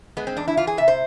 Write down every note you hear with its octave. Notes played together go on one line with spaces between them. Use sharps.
G#3 B3
C4
E2 D4
E4
E3 F4
G#4
C3 E5
C5